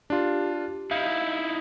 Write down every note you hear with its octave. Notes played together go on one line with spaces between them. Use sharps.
D4 F4 G4
D#4 E4 F5